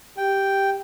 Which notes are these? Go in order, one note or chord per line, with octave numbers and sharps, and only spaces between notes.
G4 G5